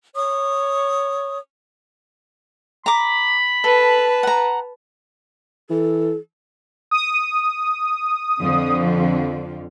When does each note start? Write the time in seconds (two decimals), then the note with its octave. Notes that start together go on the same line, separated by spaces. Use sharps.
0.15 C#5 C#6 D#6
2.86 A#5 B5 D6
3.64 A4 B4 A5
4.23 F#5 A#5
5.70 E3 A4
6.91 D#6
8.41 F2 D3 F3